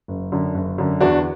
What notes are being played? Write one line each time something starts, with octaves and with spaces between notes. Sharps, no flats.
F#1
F#2 D3
F#1
F#2 D3
E2 D4 F#4